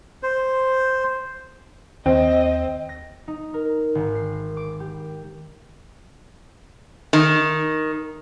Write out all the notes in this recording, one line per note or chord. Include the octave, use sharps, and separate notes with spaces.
C5
D#2 C4 D#5
A#6
D#4
A#4
G#1
C7
D6
G4
D#3